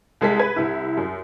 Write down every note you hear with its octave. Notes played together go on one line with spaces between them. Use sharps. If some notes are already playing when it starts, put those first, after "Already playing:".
C2 G#3 A4 B6
B4 G#6
C2 E4
F#2